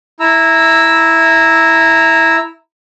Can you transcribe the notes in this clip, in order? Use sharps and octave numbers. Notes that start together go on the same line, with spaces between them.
E4 A#5 E6